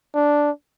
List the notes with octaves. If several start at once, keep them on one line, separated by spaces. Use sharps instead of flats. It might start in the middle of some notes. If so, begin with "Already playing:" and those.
D4